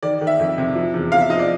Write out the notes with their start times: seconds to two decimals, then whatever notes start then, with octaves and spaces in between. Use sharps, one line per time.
0.03 D#3 D5
0.21 D#3
0.27 E5
0.39 F2
0.58 C3
0.75 F3
0.94 E2
1.12 E2 F5
1.20 E5
1.30 F3 D#5
1.39 D5